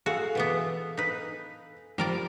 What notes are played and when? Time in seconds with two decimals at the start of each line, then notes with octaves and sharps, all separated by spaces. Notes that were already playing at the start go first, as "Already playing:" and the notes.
0.06 F#4 G#4 A4 F5
0.35 B2 E3 B3
0.97 D#4 B4
1.98 F3 G3 A#4 D5